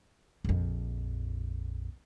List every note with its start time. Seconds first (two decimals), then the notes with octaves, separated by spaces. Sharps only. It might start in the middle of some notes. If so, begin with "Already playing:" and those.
0.44 A#1 F2